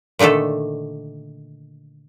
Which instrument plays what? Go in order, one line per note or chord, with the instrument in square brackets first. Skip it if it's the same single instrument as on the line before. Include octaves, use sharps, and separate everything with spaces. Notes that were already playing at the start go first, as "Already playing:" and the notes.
[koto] A#2 D3 D#3 A3 A4